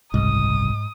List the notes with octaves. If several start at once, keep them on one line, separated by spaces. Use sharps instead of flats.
F#1 C2 G#2 D#6